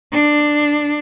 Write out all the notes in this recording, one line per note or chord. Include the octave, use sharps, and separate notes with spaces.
D4